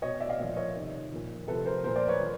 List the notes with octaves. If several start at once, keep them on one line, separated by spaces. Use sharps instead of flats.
B2 C#5 D#5
D5 E5
D#5 F5
A#2 F3 D5 E5
C#5 D#5
C3 D#3
A#2 F3
C3 F3 A4 B4
A#4 C5
A#2 F3 A#4 C5
C5 D5
B4 C#5
F3